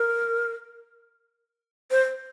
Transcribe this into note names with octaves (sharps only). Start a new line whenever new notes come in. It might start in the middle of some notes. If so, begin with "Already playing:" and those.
Already playing: A#4
C5